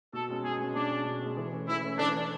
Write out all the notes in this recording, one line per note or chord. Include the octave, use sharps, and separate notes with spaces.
B2 A4
G#3 C#4
B2 G#4
G#3 C#4
B2 D4
G#3 C#4
B2
G#3 C#4
E3
A3 C#4
E3 E4
A3 C#4
E3 D4
A3 C#4